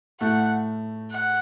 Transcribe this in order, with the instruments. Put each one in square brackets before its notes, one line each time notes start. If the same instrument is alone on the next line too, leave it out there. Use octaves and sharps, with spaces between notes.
[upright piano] A2 A3 [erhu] F#5
[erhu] F#5